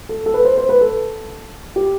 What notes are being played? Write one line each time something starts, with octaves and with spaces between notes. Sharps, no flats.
A4
A4
B4
C5
C5
B4
A4
G4